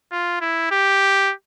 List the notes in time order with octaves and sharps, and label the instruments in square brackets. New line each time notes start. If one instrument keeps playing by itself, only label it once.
[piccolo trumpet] F4
E4
G4